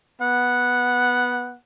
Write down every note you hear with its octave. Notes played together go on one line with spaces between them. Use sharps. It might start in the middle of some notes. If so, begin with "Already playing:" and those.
B3 F#5